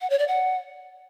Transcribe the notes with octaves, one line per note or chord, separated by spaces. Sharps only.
F#5
C#5
D5
F#5